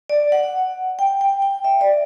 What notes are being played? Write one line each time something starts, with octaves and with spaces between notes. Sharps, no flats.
D5
F#5
G5
G5
G5
E5
D5